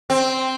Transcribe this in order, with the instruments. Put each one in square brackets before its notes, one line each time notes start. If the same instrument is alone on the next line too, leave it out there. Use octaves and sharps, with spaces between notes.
[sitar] C4